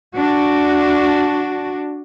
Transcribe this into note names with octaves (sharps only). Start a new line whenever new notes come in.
D4 F#4